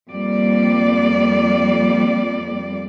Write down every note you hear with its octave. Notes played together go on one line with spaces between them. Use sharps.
F2 G3 A#3 D5